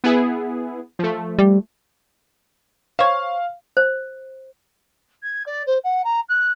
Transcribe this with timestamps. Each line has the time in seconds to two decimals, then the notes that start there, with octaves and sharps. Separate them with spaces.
0.04 B3 E4 G#4
0.99 F3 A3
1.39 G3
2.99 C5 C#5 F5
3.77 C5
5.23 G#6
5.46 D5
5.66 C5
5.84 F#5
6.04 A#5
6.29 F#6